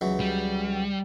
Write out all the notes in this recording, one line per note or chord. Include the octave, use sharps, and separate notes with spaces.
C#2 E3 F#3
G3